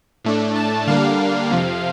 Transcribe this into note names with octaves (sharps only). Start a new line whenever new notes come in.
A2 A3 D4
A5
D3 G3 A#3 D4 F5
F2 C3 F3